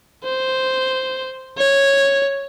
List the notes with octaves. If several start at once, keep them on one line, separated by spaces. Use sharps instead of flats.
C5
C#5